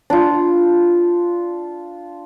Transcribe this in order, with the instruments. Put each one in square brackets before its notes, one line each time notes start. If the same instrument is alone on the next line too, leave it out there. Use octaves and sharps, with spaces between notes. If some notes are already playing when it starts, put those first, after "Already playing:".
[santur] D4 F4